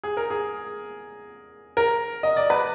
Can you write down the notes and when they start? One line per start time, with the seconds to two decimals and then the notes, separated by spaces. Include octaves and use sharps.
0.04 G#4
0.17 A#4
0.30 G#4
1.77 A#4
2.23 D#5
2.36 D5
2.50 B4